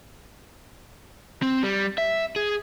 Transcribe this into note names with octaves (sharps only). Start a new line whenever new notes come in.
C4
G3
E5
G#4